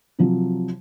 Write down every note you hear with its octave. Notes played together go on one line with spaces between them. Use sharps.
C3 F3 F#3